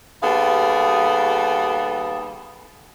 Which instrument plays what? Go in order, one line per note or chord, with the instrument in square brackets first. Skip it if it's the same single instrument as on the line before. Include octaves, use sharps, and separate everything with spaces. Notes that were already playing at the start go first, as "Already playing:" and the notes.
[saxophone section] D#2 G3 B3 G#4 A4 F5